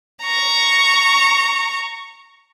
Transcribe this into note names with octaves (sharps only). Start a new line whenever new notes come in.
A#5 C#6